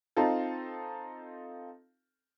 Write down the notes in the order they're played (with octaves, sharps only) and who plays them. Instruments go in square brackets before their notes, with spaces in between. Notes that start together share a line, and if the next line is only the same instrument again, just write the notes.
[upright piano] C4 D#4 F4 A4